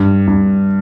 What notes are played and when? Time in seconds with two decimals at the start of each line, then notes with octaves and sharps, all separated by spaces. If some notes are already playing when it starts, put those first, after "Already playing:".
Already playing: G2
0.27 G2